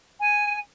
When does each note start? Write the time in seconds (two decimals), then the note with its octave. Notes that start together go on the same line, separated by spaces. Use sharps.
0.20 G#5